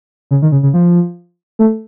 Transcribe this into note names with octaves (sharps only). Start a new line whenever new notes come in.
C#3
D#3
C#3
C#3
F3
A3